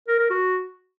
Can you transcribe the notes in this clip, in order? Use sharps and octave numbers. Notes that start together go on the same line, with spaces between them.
A#4
A#4
F#4